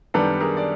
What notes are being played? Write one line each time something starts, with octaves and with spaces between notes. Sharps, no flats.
F#2 D#3 G3 B3 D4 A4 B4
G#4 A#4
D5